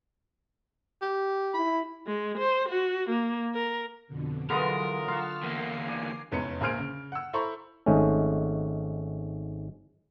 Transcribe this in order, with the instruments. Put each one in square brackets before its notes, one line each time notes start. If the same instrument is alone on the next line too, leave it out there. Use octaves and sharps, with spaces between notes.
[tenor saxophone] G4
[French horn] E4 [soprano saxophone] B5
[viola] G#3
C5
F#4
A#3
A#4
[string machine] F2 B2 D3
[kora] D3 E3 G#3 [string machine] F#3 [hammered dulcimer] B3 F4 D#5 [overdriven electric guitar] A#4
[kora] F4 [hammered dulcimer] F#4 F5 [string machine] A5 E6 F6
[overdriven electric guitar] E2 A#3 [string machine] A#4 C7
[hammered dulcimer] D5 G#5
[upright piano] F1 E2 G#3 C#4 B4 C#7
A#1 A#3 G#4 C5 F6 D7
C#3
F#5 E6
E4 A4 C5 A#5 B5 C#6
[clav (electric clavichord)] G#1 G#2 G#3 A3 C#4